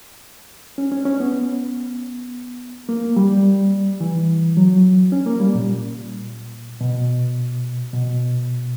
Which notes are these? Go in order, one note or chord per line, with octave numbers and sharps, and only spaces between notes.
C#4
C#4
C#4
B3
A#3
G3
E3
F#3
C#4
A#3
G3
A#2
B2
B2